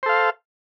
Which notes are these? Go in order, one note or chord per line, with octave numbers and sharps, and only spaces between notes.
A4 C5 F5